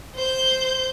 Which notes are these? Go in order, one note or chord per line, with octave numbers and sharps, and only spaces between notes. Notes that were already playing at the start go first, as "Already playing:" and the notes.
C5 G6